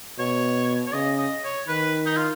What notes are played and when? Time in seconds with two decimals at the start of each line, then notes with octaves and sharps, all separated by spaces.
0.19 B2 C#5
0.87 C#5
0.93 C#3 D#5
1.18 D#5
1.44 C#5
1.68 D#3 B4
2.06 D#4
2.17 F4